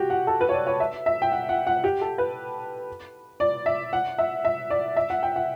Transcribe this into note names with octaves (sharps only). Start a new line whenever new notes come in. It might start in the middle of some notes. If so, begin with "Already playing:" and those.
Already playing: F#4 G4
F#5
A4
B4
C#5
D5
C#5
E5
E5
G5
F#5
F#5
F#5
G4
A4
B4
D5
E5
F#5
E5
E5
D5
E5
F#5
G5
F#5